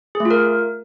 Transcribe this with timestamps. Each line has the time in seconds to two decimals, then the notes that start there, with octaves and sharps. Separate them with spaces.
0.15 G#4
0.20 A3
0.25 F4
0.31 A#4